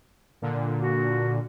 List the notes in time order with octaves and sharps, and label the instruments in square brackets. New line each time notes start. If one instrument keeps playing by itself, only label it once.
[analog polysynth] A#2 D3
[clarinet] F#4